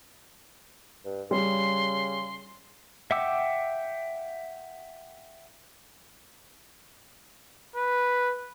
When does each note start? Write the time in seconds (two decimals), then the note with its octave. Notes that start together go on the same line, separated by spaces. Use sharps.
1.05 G2
1.31 C#3 G3 C6
3.11 E5 F#5 G5 D6 E6
7.76 B4